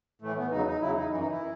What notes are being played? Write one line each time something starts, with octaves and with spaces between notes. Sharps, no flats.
A2 E3 A3
B3
E2 C#3 F#3 D#4
D#4
E2 C#3 F#3 E4
D#4
F#2 E3 D#4
D#4
E4
E3